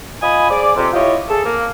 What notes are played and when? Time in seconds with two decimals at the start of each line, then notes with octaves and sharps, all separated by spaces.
0.21 F4 D#5 G#5 B5 D#6
0.49 G#4 C5 D5
0.76 F2 C3
0.93 E4 F4 G4 C#5 D#5
1.29 G#4 A4
1.44 A#3